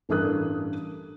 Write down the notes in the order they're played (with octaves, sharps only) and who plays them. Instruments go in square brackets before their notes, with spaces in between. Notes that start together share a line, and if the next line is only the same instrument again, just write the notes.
[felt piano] A1 G2 A4 A#4 D#6 F#6